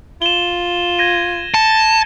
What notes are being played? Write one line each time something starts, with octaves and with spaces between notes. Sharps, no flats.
F4 E7 G7
G#6 A#6 D#7
A5 C#7